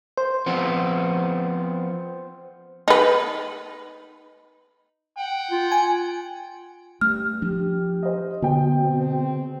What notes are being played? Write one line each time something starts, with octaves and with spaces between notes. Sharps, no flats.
C5
F3 B3 C4
D#4 B4
F#5 G5
F4
G#5
G2 A3 F6
F3 D4 G4
C5 D#5
B2 D3 G5
C#3 C4